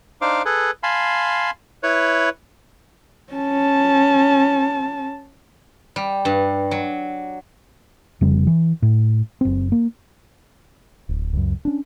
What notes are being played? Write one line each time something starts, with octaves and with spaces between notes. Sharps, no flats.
D4 D#4 C5 F5 D6
G#4 A4 B4
F5 G#5 A5 B5 C6
E4 B4 C#5
C#4 A5
G3
G2
F#3
F1 F2 C#3 G3
E3
A2
F#1 C4
A#3
D1
C#2 F#2
C#4 D4